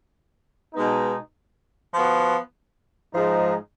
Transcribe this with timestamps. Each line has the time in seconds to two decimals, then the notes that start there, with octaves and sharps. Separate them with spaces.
0.74 B2 G#3 B3 D#4
1.94 F3 B3 F#4
3.13 G#2 F3 G#3 D#4